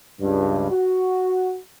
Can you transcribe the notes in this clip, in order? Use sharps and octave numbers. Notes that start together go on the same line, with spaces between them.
C#2 G2
F#4